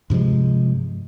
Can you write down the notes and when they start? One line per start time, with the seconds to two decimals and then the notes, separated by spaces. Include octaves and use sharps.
0.10 G2 C3 F3 G#3